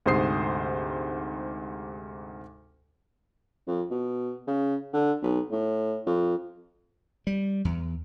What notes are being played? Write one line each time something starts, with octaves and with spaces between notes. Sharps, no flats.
D2 G#2 C3 C5 D#6 C7
F2
B2
C#3
D3
B1
A2
F2
G3
E2